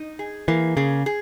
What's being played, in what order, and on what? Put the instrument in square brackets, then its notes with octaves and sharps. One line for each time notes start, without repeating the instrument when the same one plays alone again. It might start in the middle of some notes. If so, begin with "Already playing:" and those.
Already playing: [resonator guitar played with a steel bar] D#4
G#4
[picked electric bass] E3 [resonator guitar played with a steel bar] A#3
[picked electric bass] C#3 [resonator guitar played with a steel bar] G#4
[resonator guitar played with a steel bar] G#4